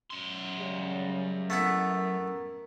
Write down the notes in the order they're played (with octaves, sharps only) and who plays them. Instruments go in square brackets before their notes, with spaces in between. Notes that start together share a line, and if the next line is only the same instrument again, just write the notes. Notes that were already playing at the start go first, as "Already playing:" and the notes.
[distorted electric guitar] F#2 C6
[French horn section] C#3 G3 G#3
[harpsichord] A3 B3 E4 [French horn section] A#4